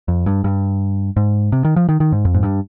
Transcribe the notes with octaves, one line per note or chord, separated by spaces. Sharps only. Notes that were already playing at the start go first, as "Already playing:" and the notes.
F2
G2
G2
G#2
C3
D#3
F3
D#3
D#3
G#2
F2
G#2
G2